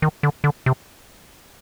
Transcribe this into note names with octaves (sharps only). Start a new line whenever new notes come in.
D#3
D3
D3
C3